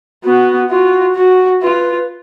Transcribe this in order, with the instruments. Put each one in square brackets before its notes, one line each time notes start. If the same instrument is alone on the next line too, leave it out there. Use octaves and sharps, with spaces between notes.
[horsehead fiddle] B3 [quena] F#4
[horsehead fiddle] F4 [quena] F#4
[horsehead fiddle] F#4
[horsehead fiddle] F4 [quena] B4